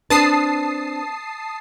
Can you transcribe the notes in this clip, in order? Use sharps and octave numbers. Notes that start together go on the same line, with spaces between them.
C4 D4 B4 A5 D#6 C7